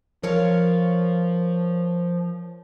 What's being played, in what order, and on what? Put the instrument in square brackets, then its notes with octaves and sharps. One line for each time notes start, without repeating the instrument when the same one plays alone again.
[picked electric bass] F3 [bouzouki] A#4 C#5 F5